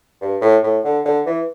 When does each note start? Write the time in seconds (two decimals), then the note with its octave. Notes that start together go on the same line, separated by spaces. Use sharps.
0.21 G2
0.41 A2
0.63 A2
0.84 D3
1.05 D3
1.26 E3